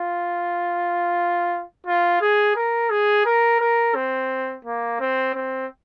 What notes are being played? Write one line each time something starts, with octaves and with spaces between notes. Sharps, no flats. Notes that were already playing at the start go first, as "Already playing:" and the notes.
Already playing: F4
F4
G#4
A#4
G#4
A#4
A#4
C4
A#3
C4
C4